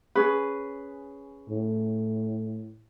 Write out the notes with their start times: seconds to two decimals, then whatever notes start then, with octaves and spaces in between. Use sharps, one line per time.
0.15 C#4 G#4 B4
1.50 A2